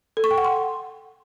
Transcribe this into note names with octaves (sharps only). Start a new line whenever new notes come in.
A4
C#6
G5
F#5
C6